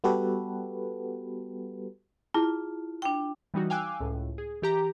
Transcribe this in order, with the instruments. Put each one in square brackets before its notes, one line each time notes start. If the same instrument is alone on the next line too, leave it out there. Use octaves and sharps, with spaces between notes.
[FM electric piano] G3 B3 F#4 G4 A4 B4
[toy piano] E4 G#4 A5 [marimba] F4
[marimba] D4 G5
[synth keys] E3 G3 D#4 F#4
F5 G5 G#5 D6 E6 F#6
C#2 A2
G#4
E3 G4 A#5